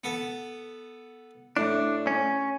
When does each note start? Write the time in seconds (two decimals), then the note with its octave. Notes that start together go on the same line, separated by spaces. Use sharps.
0.04 B3 A4
1.57 A2 D4
2.07 C#4